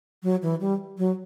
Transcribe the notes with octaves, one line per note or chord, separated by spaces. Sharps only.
F#3
E3
G3
F#3